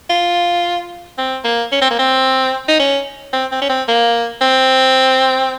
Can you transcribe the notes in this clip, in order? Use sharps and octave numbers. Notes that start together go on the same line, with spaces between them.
F4
C4
A#3
C#4
C4
A#3
C4
D#4
C#4
C4
C4
C#4
C4
A#3
C4